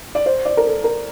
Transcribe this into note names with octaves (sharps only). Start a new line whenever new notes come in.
D5
C5
D5
A#4
A4
A#4